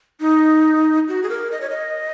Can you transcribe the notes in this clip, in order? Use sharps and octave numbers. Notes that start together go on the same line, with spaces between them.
D#4
F#4
G#4
A#4
D#5
C#5
D#5